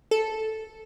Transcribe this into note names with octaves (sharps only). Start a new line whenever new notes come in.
A4